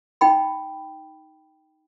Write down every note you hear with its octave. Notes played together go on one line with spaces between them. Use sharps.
D#4 G5 B5